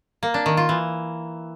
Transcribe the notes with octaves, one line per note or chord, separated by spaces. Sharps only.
A#3
D4
D#3
F4
E3